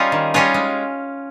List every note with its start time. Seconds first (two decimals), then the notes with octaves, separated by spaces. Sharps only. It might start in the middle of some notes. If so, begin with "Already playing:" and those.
Already playing: G3 C#4 D#4 F4 G#4
0.12 D#3
0.34 G3 C#4 F4 G#4
0.54 G#3